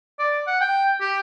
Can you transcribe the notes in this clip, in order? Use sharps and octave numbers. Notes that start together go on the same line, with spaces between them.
D5
F#5
G5
G4